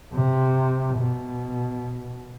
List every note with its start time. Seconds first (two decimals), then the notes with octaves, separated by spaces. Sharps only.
0.14 C3
0.98 B2